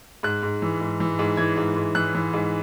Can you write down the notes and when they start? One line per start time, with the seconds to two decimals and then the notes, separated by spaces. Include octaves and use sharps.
0.23 G#2 F#6
0.43 G#2
0.62 E3
0.81 G#2
1.00 E3
1.19 G#2
1.37 E3 G#6
1.57 G#2
1.76 G#2
1.95 E3 F#6
2.15 E3
2.34 G#2